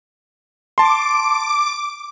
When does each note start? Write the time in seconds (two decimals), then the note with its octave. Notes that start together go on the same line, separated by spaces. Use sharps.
0.78 A5 C6 D6